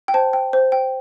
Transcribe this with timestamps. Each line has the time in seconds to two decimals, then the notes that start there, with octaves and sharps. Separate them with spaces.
0.08 G5
0.14 C5 A5
0.33 G5
0.53 C5
0.72 G5